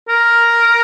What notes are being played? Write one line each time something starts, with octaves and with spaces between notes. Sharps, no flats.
A#4